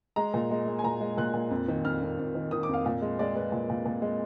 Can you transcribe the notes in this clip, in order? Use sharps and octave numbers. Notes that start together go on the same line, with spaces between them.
G#3 A#5
A#2
G#3
G#3
G#5
A#2 A#5
G#3
A#2 F#6
A#2
F2
D#3
F2 F6
F2
F2
D#3
D#3 D#6
F2 D6
F5
A#2 F5
G#3
G#3 D5
G#3 B4
A#2
A#2
A#2
G#3